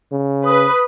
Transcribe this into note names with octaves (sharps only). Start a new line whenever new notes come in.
C#3
B4 D#6